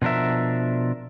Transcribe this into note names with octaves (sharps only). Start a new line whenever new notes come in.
B2 F3 D4 A#4 E5